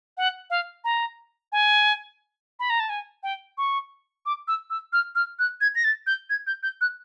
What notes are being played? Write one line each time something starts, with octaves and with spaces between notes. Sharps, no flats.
F#5
F5
A#5
G#5
B5
A#5
A5
G#5
G5
C#6
D6
E6
E6
F6
F6
F#6
G#6
A#6
A6
G6
G#6
G6
G6
F#6